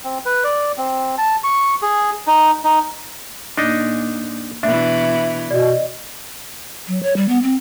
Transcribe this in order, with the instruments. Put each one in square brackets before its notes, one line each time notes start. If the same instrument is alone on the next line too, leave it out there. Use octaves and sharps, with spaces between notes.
[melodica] C4
B4
D5
C4
A5
C#6
G#4
D#4
D#4
[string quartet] A#2 [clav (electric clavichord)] D4 D#4 D#5
[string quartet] B2 E3 [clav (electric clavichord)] D4 [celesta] E5
[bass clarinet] B2 [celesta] D5 D#5
[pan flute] F#3
C#5
G3
B3
C4